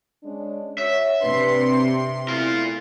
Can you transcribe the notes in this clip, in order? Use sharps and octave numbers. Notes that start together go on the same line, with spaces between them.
G#3 C#4 D4
F#4 C#5 E5
C3 D4 B4 C6
A3 B3 E4 F4 A#4